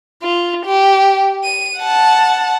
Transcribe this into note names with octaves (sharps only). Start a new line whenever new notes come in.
F4
G4
D#7
F#5 A5